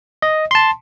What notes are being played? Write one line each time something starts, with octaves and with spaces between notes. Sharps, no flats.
D#5
A5 C6